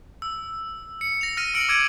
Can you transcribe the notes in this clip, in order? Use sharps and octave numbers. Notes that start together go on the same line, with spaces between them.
E6
C#7
A#6 F7
F6 A#6 D#7
E6 C#7 D7 F#7
D6 E6 G#6 D7 D#7